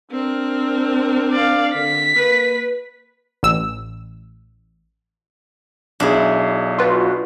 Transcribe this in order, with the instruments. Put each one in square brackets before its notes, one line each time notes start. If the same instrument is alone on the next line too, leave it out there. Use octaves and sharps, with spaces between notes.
[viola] C4 A#4 [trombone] D4
[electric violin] D5 F5
[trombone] D3 [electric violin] B6
[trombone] A#3 [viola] B4
[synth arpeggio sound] A1 E6
[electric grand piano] B1 G#4 [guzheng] D4 E4
[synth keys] F4 F#4 B4